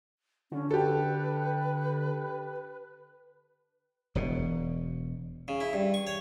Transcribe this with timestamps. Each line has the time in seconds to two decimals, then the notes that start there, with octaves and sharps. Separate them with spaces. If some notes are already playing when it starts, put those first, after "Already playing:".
0.52 D3 C#4
0.71 G4 A4 B4
4.15 E1 B2
5.48 C#3
5.60 E4
5.73 G2
5.94 C#6
6.07 C#5